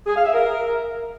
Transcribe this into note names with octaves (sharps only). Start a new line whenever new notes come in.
G#4
F5
E5
A#4